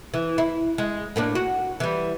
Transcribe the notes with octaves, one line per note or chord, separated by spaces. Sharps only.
E3
E4
G#3
A2 A#3 D4
F#4
E3 G3